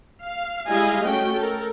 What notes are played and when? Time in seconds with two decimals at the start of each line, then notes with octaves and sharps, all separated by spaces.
0.21 F5
0.68 G3 G#3 E4 D#5 F5 G#5
1.02 A3 C#4 F#4 G5
1.36 A4 A#4